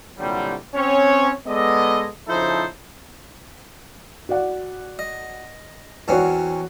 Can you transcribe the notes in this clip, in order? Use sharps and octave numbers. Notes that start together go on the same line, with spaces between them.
C2 A#2 D3 F#3 G3
C4 C#4 C#5
G#3 B3 A4 D5 D#5
C#3 F3 D#4 E4 A4 C5
F#4 D5 F#5
D#5
E2 C4 C#4 F#4 C#5 D5